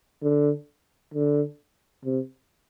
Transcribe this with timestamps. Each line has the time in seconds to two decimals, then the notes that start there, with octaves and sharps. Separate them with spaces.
0.23 D3
1.14 D3
2.05 C3